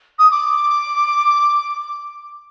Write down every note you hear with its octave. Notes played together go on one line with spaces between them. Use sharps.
D#6
D6